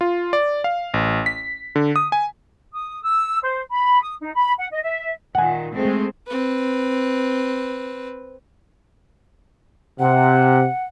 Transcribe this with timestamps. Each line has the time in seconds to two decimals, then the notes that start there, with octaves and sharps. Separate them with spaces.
0.01 F4
0.33 D5
0.64 F5
0.94 A1
1.26 B6
1.76 D3
1.96 D#6
2.12 G#5
2.74 D#6
3.03 E6
3.43 C5
3.71 B5
4.02 D#6
4.21 D#4
4.34 B5
4.59 F#5
4.71 D#5
4.83 E5
5.35 A#2 D#3 F#5 G#5
5.73 G#3 A3 C4
6.27 C4 B4
9.99 C3 F#5